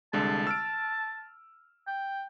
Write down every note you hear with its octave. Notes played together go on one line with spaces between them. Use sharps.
C2 D3 G#3 A5
E6 F6 D7
G5